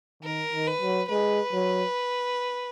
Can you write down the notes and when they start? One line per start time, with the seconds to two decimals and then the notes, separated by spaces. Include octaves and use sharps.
0.23 D#3 A#4
0.53 D#3
0.67 B4
0.81 F#3
1.09 G#3 B4
1.53 F#3